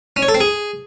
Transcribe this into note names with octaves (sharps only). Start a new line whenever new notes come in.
C#4
C#5
A4
C4
G#4